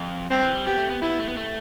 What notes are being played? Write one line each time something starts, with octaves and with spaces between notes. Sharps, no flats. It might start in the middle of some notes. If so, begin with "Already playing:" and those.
Already playing: F2
G2 C4
E3
G3
B3 G4
A3
B3
B3 E4
A3
B3
A3